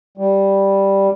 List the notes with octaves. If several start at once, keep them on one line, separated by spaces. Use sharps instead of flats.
G3